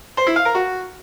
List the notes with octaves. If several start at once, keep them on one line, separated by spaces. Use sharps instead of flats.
C5
E4
F5
A#4
F#4